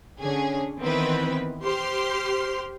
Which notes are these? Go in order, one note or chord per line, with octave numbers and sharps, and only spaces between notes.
D3 C#4 G#4
D#3 E3 B3 C4 E4 B4
G4 C5 C6 F6